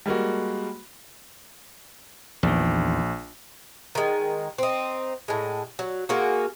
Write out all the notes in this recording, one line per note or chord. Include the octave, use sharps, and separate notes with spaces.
G3 G#3 A#3 F#4
A#1 E2 D#3
D#3 G#3
C4 D#4
A2 G#3
F#3
G#3 A#3 D#4 F#4